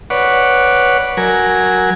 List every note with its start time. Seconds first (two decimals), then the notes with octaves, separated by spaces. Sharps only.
0.10 B4 C#5 D5 F#5
1.17 F#3 A#4 G#5